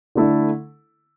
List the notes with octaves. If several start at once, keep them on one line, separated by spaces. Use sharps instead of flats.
D3 A3 E4 A4